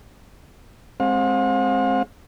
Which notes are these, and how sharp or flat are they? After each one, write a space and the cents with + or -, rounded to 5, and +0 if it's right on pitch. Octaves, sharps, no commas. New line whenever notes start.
G#3 +0 C4 +20 F5 +45